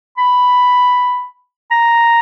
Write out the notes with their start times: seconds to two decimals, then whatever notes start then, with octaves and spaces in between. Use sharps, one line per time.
0.18 B5
1.71 A#5